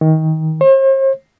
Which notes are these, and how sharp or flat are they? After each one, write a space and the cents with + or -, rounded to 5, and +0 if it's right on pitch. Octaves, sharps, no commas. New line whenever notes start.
D#3 +25
C5 +45